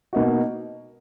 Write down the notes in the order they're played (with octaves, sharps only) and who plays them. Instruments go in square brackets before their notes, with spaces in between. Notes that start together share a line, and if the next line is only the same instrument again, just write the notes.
[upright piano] B2 A#3 D#4 F#4